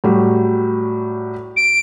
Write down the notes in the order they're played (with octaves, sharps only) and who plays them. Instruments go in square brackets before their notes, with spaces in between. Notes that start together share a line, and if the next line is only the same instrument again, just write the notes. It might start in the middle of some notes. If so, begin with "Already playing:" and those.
[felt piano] A2 F#3 G3
[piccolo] D7